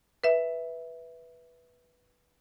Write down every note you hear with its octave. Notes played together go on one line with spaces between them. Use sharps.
B4 E5